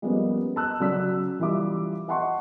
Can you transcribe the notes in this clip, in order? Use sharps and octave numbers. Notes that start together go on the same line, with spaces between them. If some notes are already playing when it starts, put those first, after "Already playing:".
F3 G3 G#3 A#3 B3 C#4
A5 E6 F#6
C#3 F#3 D5 E6 B6
E3 G3 F4 E5 D6
D#5 E5 F#5 A5 C6 C#6